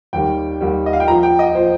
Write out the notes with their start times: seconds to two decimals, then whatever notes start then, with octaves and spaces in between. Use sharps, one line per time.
0.13 D#2 D#3 G3 G5
0.61 D#2 D#3 G3
0.86 D#5
0.93 F5
1.00 G5
1.07 A#1 A#2 F3 A#5
1.23 G5
1.39 D#5
1.55 A#2 F3 C5